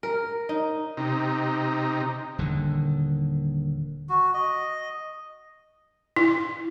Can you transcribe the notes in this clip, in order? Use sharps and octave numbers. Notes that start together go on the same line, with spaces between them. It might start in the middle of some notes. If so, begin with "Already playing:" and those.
A#4
D#4
C3 D#4
D#1 D3 D#3
F#4
D#5
E4